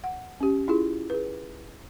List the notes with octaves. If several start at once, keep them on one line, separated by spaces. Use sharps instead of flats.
F#5
C#4 G4
E4 F4 G#4
G#4 B4